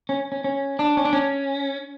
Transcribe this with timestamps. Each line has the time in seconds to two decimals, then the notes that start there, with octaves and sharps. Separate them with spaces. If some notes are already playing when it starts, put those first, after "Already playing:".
0.09 C#4
0.32 C#4
0.44 C#4
0.79 D4
0.97 C#4
1.05 D4
1.13 C#4